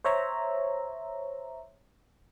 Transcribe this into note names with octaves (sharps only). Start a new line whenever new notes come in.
C5 C#5 E5 A#5